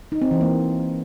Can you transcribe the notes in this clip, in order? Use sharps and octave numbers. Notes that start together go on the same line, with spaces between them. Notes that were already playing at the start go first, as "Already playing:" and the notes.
D#4
C4
E3
A#3